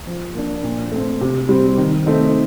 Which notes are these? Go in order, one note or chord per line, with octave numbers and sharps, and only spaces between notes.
F3
A#3 D4
A#2
A3 C4
C3
G3 C4
D#3
A3 C4 D#4